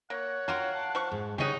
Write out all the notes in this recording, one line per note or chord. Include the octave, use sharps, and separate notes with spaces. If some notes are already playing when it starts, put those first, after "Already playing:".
A#3 C#5 F#5
F4 F#4 A#4 F5 G5
A5
F3 C#6
G#2
C#3 D#4 G4 C#5 D#5 F#5 C#6